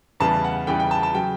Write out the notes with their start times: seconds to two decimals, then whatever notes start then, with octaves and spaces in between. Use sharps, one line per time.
0.20 E2 C#3 E3 G3 A5
0.44 F#5
0.67 E2 C#3 E3 G3 G5
0.80 G5
0.91 A5
1.03 A5
1.15 C#3 F#3 G5